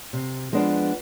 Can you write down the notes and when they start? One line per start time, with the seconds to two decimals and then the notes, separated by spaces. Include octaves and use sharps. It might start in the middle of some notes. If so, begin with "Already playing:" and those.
0.13 C3
0.52 F3 G#3 B3 D4